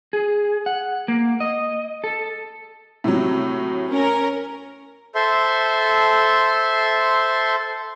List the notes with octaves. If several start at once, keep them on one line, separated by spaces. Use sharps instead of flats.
G#4
F#5
A#3
D#5
A4
A2 C3 F#3
C#4 A#4
A4 C5 E5 C6